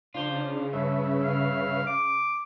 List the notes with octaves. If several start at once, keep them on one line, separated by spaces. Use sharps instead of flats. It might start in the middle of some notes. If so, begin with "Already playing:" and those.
C#3 D4 F4 C5
G2 B4 C#5 E5
F5
D6